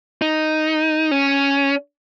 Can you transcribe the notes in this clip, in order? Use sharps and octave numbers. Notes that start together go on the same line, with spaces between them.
D#4
C#4